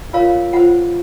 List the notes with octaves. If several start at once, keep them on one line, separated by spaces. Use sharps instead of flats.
F4 A#4 C#5 F5
F4 C5 F#5